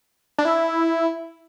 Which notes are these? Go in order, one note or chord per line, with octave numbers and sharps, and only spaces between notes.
D4
E4